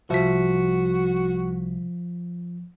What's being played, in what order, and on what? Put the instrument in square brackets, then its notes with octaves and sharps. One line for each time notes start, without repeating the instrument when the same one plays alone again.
[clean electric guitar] C2 E5 [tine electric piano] F3 B6 [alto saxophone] F#4